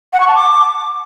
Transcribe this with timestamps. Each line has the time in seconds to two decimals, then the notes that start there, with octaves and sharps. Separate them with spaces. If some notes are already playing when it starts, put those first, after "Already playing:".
0.13 F#5
0.20 C#6
0.28 A5
0.35 D6